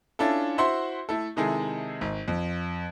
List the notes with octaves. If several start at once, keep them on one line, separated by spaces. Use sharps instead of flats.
C#4 D4 E4 F4 A4
E4 F#4 C5 E5 F#5 C6
A3 E4 A4
C3 D#3 G#3 E4 G#4 A4
G#1
F2